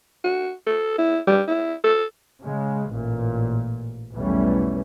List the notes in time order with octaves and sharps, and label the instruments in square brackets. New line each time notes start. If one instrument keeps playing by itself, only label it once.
[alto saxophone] F#4
A4
E4
G3
E4
A4
[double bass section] C#3 G#3
A1 A#2
B1 E2 E3 G3 A3 C#4